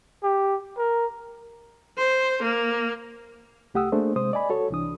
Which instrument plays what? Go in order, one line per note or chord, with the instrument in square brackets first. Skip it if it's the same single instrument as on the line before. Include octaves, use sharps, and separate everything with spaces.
[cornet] G4
A#4
[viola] C5
A#3
[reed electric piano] C2 A3 G4 F#5 D#6 E6
A3 A#3 D4 G#4 C5
C3 G#3 C5 D#6
D5 D#5 G#5 B5
F#4 A4 C#5
C2 E3 D4 D#6